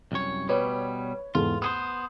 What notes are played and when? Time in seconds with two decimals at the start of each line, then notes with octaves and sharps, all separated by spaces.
0.12 C2 F#2 C#5
0.49 B2 G3 B4 C#5
1.35 E2 G#2 F4 A4
1.62 B3 G#4 C5 D#6